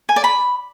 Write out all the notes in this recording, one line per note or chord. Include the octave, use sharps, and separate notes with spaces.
G#5
D5
B5